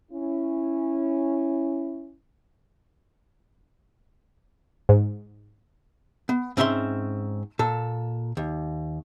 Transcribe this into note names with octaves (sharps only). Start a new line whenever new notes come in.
C#4 E4
G#2
B3
G#2 C4 C#4 E5 B5 C6
A#2 A4
D#2